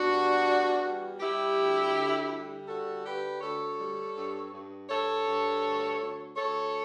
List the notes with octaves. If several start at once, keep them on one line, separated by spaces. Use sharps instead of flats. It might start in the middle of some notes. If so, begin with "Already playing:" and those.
Already playing: B2 D4 F#4
G3
E2
G3
G3 E4 G4
D2
D3
G3
D3 F#4 A4
D3 G4 B4
D2 A4 C#5
G3
G2
G2
G2 A4 C#5
G2
D2
D2
D2 A4 C#5